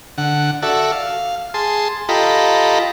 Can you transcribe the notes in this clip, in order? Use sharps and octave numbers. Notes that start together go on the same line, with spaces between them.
D3 F#5
F#4 A4 D5 E5
F5
G#4 A5 C6
F4 G4 A4 D#5 A#5 B5